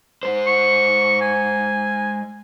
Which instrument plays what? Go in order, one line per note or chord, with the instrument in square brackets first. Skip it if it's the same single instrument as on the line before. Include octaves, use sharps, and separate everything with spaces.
[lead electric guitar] G#3 C5
[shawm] C#6
G#5